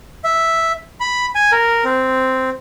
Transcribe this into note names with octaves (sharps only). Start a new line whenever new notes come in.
E5
B5
G#5
A#4
C4